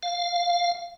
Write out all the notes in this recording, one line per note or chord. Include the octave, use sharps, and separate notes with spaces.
F5